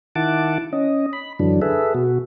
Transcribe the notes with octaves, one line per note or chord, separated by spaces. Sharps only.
D#3 E4 F#5 A5 D6
C#4 D#5
B5
F#2 D3 E3 F#3 D4
G#4 A4 B4 E5
B2 F#4